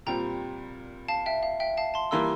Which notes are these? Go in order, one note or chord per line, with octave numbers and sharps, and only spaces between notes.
A#2 G3 C4 G5 A#5
F5 A5
E5 G5
F5
E5 G5
F5 A5
A5 C6
E3 G3 A#3 C6 E6